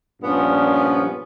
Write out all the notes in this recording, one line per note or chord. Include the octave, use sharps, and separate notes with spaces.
G2 A#2 F3 B3 C#4